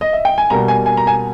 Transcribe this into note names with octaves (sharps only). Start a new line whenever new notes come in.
D#5
E5
G5
G#5
B2 G3 A#3 A#5
G#5
G#5
A#5
G#5